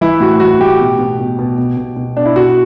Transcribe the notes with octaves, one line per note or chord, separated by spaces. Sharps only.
E3 E4
A2 F#4
E3 F#4
A2 G4
B2
B2
B2
B2
B2
B2
B2
B2 D4
E4
B2 F#4